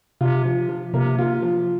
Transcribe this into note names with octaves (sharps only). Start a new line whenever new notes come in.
C3 F4
F3
F3
C3 A#3
F4
F3